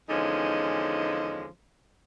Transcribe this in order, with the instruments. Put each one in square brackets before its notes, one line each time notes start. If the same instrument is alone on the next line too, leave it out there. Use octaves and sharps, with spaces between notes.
[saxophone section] E2 D3 F3 G#3 C#4 D#4